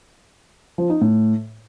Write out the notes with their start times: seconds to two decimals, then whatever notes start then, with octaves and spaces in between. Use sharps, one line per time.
0.78 F3
0.90 D#4
1.01 A2